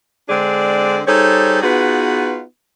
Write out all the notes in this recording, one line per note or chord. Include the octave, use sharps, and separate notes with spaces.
D3 G#3 C4 D4 G#4 D5
G3 D#4 G#4 A4 C5 C#5
B3 D#4 F4 F#4 G#4 B4